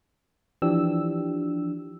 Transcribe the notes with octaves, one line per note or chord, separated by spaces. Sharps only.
E3 F3 D4 G4 E6